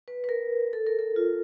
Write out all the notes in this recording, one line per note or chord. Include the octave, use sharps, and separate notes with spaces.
B4
B4
A#4
A4
A#4
A4
F4